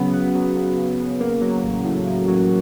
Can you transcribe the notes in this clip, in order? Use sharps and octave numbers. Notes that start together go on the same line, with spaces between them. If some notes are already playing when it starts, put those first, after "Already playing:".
Already playing: C#3 F#3 B3
B3
F#3
C#3
C#3
C#3
A#3
F#3
A1
A2
A2
F#3